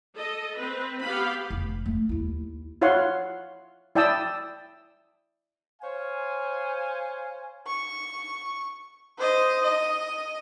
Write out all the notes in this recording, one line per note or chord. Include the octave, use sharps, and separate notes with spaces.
A4 D#5
C4 B4
B3 G4 F5 B5
F1
A3 C4
D#2 E4
E4 F4 C#5 F5 F#5 C6
E4 D5 G5 A5 D#6 E6
C5 C#5 F5 G#5
C#6
C5 D#5
D#5